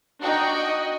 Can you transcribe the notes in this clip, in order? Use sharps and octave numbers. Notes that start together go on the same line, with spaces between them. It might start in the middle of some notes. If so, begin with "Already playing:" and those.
D4 D#4 F#4 G5
D#5